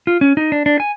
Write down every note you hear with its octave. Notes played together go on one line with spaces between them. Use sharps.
F4
C#4
D#4
D4
D4
G#5